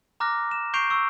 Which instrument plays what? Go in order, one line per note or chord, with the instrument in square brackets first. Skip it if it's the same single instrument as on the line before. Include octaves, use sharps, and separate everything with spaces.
[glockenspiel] A#5 D6 F6 F#6 A#6
E7
C#6 G6 C7 D7 F7
C#6 E6